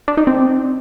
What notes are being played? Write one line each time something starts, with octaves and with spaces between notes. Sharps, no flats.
D4
D#4
C4